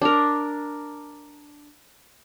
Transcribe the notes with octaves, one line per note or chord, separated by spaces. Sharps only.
D4 A#4